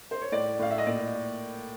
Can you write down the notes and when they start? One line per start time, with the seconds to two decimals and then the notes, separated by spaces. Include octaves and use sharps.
0.11 C5
0.22 C#5
0.32 A2 D5
0.59 A2 F5
0.71 E5
0.78 D#5
0.87 A#2 D5